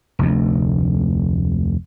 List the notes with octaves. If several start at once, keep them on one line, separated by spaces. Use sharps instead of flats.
F1 D2